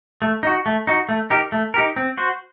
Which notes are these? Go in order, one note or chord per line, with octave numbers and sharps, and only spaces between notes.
A3
D#4 F#4
A3
D#4 F#4
A3
D#4 G4 A#4
A3
D#4 G4 A#4
C4
F#4 C5